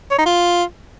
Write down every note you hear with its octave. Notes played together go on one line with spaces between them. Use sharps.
C#5
D#4
F4